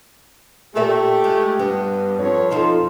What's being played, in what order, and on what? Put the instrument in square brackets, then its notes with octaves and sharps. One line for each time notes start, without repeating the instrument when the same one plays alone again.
[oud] A#2 A#4 E5 [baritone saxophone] A3 [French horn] G4
[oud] G#3
[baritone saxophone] G2 [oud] B3
[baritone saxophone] F2 [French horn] C#5
[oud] F3 F4 A4 [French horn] D#4